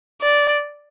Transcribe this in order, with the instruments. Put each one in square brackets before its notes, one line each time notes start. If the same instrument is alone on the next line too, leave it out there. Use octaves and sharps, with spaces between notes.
[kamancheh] D5